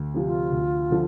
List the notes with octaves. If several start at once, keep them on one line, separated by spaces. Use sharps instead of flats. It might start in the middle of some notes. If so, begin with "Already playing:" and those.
Already playing: D2
C3 F3
F4
D2
D3 F3